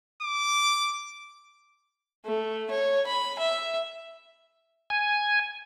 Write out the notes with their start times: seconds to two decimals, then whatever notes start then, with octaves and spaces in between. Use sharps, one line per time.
0.22 D6
2.25 A3
2.71 C#5
3.07 B5
3.39 E5
4.90 G#5